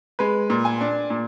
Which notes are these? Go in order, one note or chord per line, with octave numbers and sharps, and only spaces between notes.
G#3 B4
A#2
G#5
D4
A#2